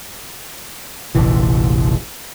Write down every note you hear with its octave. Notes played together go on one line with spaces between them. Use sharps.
F1 A#1 E3